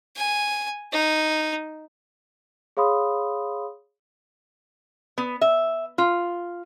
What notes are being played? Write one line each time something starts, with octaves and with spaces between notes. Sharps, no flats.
G#5
D#4
G#4 C#5 F5 B5 C6 D#6
B3
E5
F4